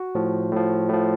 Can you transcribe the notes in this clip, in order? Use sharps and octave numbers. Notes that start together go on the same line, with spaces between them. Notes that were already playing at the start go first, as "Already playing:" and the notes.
Already playing: F#4
A2 F3
A2 F3
A2 F3